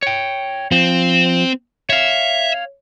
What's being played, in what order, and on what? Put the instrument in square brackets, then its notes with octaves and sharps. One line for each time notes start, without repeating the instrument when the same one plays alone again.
[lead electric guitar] C#5 G5
[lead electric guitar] F3 [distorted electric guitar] C4
[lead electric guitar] C#5 F5 [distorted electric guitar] E5